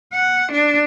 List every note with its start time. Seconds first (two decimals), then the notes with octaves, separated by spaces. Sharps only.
0.14 F#5
0.52 D4